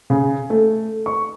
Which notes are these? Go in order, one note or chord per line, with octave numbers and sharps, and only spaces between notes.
C#3
A3
C#6